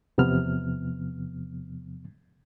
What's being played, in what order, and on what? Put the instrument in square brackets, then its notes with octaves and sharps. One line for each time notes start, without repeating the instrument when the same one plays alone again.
[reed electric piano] E2 C3 F3 B3 F6